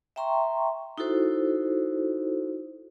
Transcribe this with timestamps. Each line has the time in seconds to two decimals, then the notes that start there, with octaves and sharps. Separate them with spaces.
0.16 E5 G5 A#5 C6 C#6
0.98 D#4 E4 F#4 A4 C5